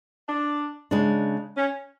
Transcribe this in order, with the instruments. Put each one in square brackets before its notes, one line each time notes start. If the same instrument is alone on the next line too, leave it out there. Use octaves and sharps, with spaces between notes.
[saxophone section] D4
[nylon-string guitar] C#3 G#3 D4
[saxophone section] C#4